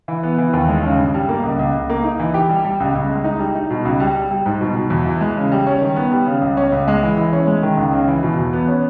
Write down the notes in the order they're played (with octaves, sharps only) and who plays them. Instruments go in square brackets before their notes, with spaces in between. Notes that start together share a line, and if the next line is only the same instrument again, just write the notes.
[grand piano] E3
B3
E3
D#2
G#3
C#3
G2
G3
A#3
C#2
C#2
C#2
A#3
D#4
E3
G4
G3
G3
C#2
C#2
G#3
D#4
G3
D#4
B2
C#2
G3
G3
G3
G#2
B2
B2
E2
E3
G#3
C#3
G3
C#4
D#3
B3
G3
C#3
C#2
C#4
C#2
G#3
E3
E3
C#4
G#3
D#3
C#2
C#3
E3
B2
E2
B3
C#4